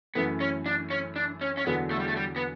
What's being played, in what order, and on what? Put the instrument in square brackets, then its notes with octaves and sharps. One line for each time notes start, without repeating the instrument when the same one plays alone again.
[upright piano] F#2 E3 A3 [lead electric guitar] B3
[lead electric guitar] C#4
D4
C#4
D4
C#4
C#4
[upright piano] E2 D3 F#3 [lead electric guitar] B3
[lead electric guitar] A3
G3
A3
G3
B3